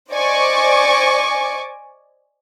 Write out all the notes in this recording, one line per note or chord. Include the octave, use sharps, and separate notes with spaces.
C5 D5 D#5 G#5 C#6 D6